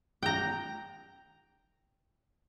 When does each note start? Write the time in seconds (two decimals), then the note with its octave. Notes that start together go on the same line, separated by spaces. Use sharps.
0.23 G5 A#5